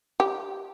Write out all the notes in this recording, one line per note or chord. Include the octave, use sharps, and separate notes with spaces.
G4